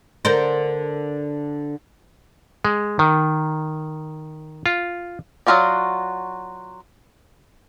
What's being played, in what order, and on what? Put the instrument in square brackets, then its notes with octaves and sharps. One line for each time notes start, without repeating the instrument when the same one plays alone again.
[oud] D3 A#4 C5
[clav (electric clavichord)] G#3
D#3
F4
[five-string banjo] F#3 C4 F4 F#4 D5